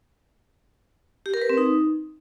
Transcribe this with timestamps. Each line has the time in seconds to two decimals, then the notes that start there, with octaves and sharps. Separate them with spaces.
1.26 G4
1.34 A#4
1.42 B4
1.49 C4
1.57 D#4